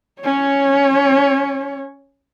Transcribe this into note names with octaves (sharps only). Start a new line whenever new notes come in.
C#4 C#5